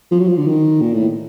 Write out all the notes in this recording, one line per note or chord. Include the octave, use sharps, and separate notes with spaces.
F3
F#3
F3
D3
D#3
A#2
A2